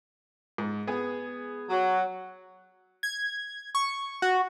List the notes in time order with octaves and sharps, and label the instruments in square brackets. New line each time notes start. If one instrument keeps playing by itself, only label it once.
[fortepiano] G#2
B3 G#4
[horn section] F#3
[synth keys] G#6
C#6
F#4